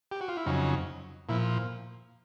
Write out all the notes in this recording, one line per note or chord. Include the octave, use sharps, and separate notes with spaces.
G4
F#4
F4
E4
F2 C#3 F#3 D#4
A#2 F3 E4